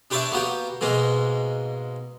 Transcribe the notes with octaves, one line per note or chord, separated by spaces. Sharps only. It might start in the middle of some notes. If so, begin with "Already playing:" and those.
D4 G4 B4 C#5 D5 E5
A#3 B3 F#4 G4
G#2 B2 G#3 A#3